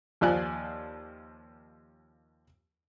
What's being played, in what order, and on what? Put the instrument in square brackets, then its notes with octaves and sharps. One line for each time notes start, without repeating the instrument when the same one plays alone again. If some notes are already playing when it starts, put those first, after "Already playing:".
[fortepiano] D#2 F3 F4 D5 G#5 F#6